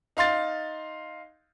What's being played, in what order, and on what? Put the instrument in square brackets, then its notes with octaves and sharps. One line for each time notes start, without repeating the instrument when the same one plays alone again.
[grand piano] D#4 F5 C6 A6